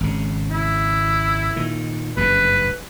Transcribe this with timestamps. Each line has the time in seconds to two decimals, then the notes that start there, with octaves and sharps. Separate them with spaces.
0.01 G#1 C#3
0.51 E4
1.56 A#2 D#3
2.17 F#1 D2 G2 B4